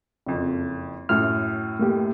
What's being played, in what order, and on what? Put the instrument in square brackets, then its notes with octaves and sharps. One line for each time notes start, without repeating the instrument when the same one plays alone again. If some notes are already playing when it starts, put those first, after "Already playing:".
[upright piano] F#1 F2
[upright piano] F#2 A2 [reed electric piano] F6
[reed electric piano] A3 A#3 G4